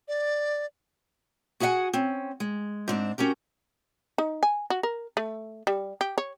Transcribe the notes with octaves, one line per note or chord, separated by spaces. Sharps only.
D5
F#4 G#4 B4 E5 F#5 G#5
C4 C#4
G#3
G#2 C4 D4
C#4 F#4 G4 A#4
D#4
G#5
F#4
A#4
A3
G3
G4
C#5